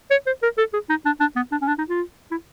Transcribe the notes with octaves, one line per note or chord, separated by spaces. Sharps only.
C#5
C5
A#4
A4
G#4
D#4
D4
D4
B3
D4
C#4
D4
D#4
F4
E4